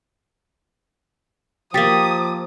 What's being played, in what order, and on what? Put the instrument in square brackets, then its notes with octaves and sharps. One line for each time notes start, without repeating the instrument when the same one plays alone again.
[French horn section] F3 [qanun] A#3 G4 [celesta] G5 A6 B6 [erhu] D#6